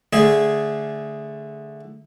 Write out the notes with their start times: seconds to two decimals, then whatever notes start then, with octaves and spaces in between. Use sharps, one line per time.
0.13 D3 A3 G#4